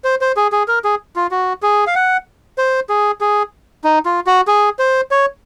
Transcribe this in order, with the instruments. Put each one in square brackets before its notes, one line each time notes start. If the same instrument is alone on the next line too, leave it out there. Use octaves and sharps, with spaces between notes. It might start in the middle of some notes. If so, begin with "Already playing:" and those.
[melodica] C5
C5
G#4
G#4
A#4
G#4
F4
F#4
G#4
F5
F#5
C5
G#4
G#4
D#4
F4
F#4
G#4
C5
C#5